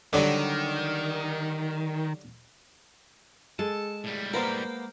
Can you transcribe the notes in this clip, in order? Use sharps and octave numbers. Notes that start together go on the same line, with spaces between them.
D3 D#3 F#3 G3
G#3 A4 A5
A2 G3
A#3 B3 A#4 C5